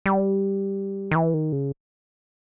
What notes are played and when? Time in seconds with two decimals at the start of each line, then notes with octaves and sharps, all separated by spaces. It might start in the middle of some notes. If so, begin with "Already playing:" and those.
0.06 G3
1.11 D#3
1.15 E3
1.34 D#3
1.52 C#3